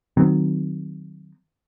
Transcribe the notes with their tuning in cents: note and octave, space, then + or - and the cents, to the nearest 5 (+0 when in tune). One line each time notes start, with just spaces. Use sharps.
D#3 -25 F#3 +0 C4 -20